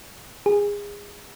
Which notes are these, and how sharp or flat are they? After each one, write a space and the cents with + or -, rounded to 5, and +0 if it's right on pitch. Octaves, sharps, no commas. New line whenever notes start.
G#4 -25